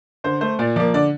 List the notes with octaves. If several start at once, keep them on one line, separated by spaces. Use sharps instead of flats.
D3 C5
A3 C5
A#2 D5
F3 A#3 D5
D3 D5